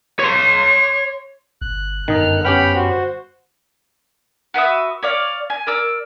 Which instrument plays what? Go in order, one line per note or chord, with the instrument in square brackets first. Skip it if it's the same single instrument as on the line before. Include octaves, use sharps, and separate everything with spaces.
[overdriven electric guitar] C#5 C6
[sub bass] G1 [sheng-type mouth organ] F#6
[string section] G1 A4 F6 [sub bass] F#2 [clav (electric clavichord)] D#3 D#4
[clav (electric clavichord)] B3 C#4 G4 [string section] F#5 [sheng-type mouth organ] G5 B5 F6
[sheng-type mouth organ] F#4 [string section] C5
[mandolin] F#4 B4 E5 D#6
C#5 D5 F5
G#5
A#4 D5 E6